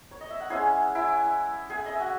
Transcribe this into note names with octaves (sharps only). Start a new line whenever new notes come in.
C#5
D#5
E5
F#5
G#3 C#4 E4 G#4 G#5
E4 E5
G#4 G#5
D#5
E5
F#4 F#5